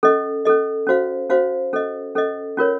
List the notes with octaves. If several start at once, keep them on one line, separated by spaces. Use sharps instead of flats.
C#4 A4 D#5
C#4 A4 D#5
C#4 F#4 C5 F5
C#4 F#4 C5 F5
C#4 A4 D#5
C#4 A4 D#5
C#4 F4 A#4 C#5